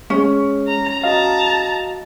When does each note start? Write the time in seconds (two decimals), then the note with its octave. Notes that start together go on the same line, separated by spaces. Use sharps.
0.10 G#3 C#4 G#4
0.68 A#5
1.04 F#4 D#5 F5 A5 A#5